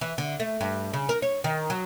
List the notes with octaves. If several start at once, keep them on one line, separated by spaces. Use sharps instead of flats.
E3
D3
A3
G2
C#3
A#4
C#5
D#3
F#3